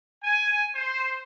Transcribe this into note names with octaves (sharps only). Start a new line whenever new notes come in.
G#5
C5